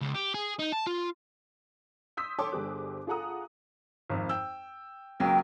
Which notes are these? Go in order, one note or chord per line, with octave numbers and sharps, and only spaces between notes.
C#2
G4
G#4
D#4
A5
F4
C6 D#6 E6 G6 B6
A4 C#5 G5 A5 C6 D6
G1 G3 G4 G#4 C5 F#6
F4 G#4 A4 F#5 A#5 D#6
G#1 F2
G5 E6
C#2 F#3 A#3 G5